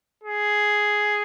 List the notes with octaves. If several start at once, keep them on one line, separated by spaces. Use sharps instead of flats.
G#4